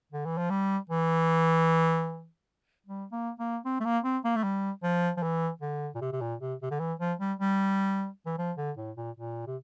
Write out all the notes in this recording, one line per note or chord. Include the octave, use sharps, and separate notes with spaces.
D3
E3
F3
G3
E3
G3
A#3
A#3
C4
A3
A#3
C4
A#3
A3
G3
F3
F3
E3
D3
A#2
C3
C3
A#2
C3
C3
D3
E3
F3
G3
G3
E3
F3
D3
A2
A#2
A#2
C3